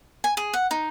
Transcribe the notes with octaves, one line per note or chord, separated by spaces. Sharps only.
G#5
G#4
F#5
D#4